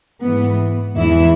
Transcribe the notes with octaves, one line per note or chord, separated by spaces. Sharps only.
G#2 E3 B3
E2 E3 E4